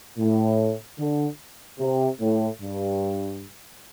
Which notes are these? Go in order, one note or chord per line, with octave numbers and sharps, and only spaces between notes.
A2
D3
C3
A2
G2